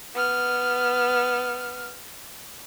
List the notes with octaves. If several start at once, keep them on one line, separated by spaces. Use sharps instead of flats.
B3 F6